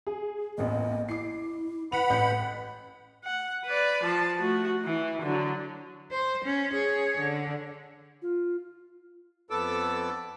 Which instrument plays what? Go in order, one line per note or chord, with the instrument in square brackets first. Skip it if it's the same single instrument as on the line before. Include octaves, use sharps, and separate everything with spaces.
[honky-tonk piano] G#4
[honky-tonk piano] A1 E2 A#2 [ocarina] D#5
[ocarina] E4 [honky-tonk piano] D6 C7
[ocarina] B4 [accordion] F#5 B5 [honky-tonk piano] F7
[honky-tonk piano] A1 G6 C#7
[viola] F#5
B4 D5
F3 A5
A3 F#4
E3
D3 F#3
[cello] C5
C#4
G#4 C#5
D3
[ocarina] F4
[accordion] F2 B3 A4 D6 E6